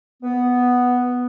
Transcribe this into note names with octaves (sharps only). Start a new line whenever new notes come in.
B3